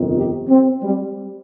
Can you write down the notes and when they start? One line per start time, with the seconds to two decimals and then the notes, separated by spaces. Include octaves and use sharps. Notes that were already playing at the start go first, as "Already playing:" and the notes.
Already playing: G1 F2 C3 D#3
0.16 G4
0.49 C4
0.83 G3